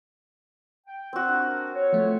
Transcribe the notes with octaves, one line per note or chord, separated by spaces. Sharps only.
G5
C4 F#4
D4 A#4
C#5
F3 A3